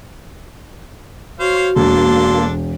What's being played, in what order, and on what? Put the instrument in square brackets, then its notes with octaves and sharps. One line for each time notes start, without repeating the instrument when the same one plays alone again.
[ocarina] F#4 [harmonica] C5 C#5 F5
[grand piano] E1 [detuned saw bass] A#3 [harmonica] D4 A4 C6